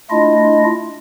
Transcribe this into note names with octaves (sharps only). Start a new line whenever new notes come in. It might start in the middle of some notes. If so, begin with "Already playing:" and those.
A3 D4 E4 F4 D#5